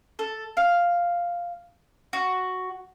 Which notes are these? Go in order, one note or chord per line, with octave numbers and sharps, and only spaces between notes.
A4
F5
F#4